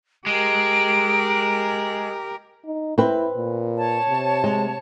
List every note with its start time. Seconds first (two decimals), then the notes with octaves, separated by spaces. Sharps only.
0.26 G#3 G4 A#4 D7
2.65 D#4
2.98 C4 E4 B4
3.36 A#2
3.77 C#5 A5
4.08 C3
4.44 G#3